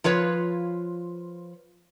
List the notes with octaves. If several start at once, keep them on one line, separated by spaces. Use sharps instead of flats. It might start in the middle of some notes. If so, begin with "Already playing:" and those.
F3 F4 B4 C#5